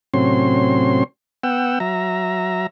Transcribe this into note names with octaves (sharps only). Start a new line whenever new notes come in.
A2 C3 F#3 C4 C#4 C6
B3 F#5 G5 E6
F#3 E5 A#5